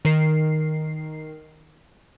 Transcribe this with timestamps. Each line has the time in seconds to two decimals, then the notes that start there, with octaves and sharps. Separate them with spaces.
0.05 D#3 A#4 C7